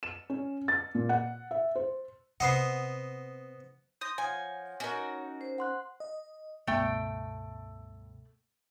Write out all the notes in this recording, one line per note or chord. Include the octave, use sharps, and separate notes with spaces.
E7
C#4
A6
A#2
F#5
E5
C5
C3 B3 C5 D#5 F#5 D#6 C7
C6 D#6 G6 A#6
F3 C#5 F#5 G#5
C#4 D#4 F#4 A#4
C5
F#5 C6 F#6
D#5
C#2 G2 B2 A3 G5